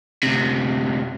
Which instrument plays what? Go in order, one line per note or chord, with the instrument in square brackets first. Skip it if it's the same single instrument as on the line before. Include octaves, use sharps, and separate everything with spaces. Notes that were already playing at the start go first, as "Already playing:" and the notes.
[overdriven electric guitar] D2 C3